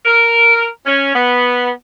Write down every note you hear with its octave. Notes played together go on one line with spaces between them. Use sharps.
A#4
C#4
B3